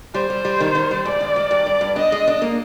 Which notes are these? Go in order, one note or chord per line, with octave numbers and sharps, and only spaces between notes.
G3 C5
G3
G3
D#3
D#3
G3
G#2 D5
D#3
D#3
G2
G2
G2
D4 D#5
G#3
D4
A#3